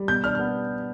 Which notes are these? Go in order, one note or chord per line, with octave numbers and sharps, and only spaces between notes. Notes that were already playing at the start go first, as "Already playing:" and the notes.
Already playing: G3
B2 G6
D4 F6
F6
B3